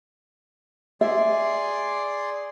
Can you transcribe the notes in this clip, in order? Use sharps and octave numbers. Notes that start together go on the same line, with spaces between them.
G#4 D5 E5 C6